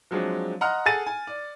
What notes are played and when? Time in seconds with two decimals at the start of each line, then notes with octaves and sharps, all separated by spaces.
0.11 F3 F#3 G#3 C4 D4
0.61 D#5 F#5 A#5 C6 F6
0.86 G#4 A4 F#5 G#5 A6 D#7
1.07 G#5
1.27 D5